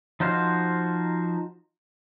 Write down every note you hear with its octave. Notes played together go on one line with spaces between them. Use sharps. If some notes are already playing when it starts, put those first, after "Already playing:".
F3 D#4 F#4 C5 F5